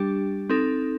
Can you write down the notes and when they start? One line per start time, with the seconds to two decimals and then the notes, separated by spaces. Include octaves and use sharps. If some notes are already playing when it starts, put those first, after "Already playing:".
Already playing: G3 D4 G4
0.49 C4 D#4 A4